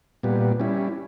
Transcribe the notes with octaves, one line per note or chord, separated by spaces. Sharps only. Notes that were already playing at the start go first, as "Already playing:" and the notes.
A#2 G3 B3
G3 C#4 E4